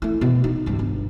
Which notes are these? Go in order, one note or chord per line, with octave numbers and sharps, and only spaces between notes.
A3 E4
B2
D#4
C#2 G2
G1